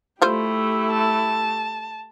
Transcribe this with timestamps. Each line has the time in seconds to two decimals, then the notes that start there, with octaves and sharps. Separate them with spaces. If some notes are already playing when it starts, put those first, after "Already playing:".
0.22 G3 A3 E4 F4 G4 C5
0.91 A5